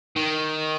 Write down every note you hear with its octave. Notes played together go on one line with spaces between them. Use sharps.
D#3